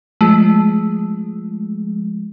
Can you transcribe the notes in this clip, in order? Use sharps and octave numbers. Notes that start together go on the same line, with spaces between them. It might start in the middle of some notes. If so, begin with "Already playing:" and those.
F3 G#3 A3